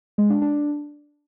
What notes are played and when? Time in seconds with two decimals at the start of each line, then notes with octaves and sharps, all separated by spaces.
0.18 G#3
0.30 D4
0.42 D4